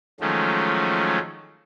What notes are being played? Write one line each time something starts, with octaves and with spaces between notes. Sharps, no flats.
D#3 F3 F#3 G#3 A3 C#4